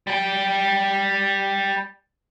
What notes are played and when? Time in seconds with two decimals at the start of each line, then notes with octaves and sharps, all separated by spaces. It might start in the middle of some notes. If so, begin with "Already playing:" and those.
0.07 G3 G5